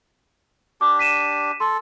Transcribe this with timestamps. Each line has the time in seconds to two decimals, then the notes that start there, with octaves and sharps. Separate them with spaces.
0.81 D4 G4 D6
0.99 B6 D#7 E7
1.60 A4 C6